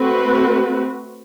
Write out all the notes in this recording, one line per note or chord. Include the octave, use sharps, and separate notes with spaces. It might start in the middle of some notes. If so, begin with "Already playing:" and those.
Already playing: A3 C4 F#4 B4